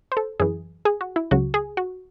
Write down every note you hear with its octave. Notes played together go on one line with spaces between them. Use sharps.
C5
A4
F#2 E3 G#4
G#4
F#4
E4
C#2 C#3 F#3 F#4
G#4
F#4